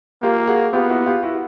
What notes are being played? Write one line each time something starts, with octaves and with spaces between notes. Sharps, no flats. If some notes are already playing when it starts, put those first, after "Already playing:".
A#3 F4 G4
F#4 G#4
B3 F4 G4
E4 F#4
F4 G4
E4 F#4